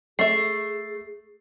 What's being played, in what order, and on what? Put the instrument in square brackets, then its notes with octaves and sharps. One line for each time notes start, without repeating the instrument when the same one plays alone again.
[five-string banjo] A3 E5 [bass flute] G#4 [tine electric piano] C7